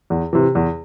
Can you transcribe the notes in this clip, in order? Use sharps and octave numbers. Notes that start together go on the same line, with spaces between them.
E2
C3 E3
E2